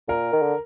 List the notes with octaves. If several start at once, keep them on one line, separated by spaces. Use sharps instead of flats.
A#2 A#4
D#3
D3